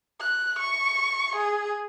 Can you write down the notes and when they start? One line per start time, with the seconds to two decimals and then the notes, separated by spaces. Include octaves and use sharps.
0.20 F#6
0.59 C#6
1.36 G#4